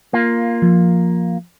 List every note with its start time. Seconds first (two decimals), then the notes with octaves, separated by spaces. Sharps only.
0.13 A#3 F4
0.62 F3